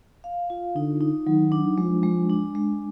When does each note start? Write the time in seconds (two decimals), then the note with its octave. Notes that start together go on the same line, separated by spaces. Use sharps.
0.24 F5
0.50 F4
0.75 D3 D#4
1.01 D#4
1.27 D#3 F#3
1.52 D4
1.78 F3 G#3
2.03 G#3
2.30 D4
2.55 G#3